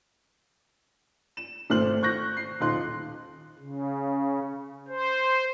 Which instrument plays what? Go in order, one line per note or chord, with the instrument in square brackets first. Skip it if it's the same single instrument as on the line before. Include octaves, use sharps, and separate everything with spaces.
[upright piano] E7
G#1 A3 C4 C5 F6 F#7
C#6 F#6 G6 A#6
C7
D#1 D#4 F4 C6 F#6
[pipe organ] C#3
C5